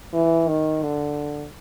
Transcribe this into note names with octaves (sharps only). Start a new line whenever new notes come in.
E3
D#3
D3